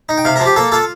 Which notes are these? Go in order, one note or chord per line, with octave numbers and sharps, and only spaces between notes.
D#4
G5
C3 F5
A#4
F3
G4
A#3 A4
F4 A4